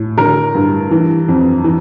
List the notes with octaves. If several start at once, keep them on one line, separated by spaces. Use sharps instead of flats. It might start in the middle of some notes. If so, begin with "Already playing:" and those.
Already playing: A2
D3 A#4
G2
E3
F2
E3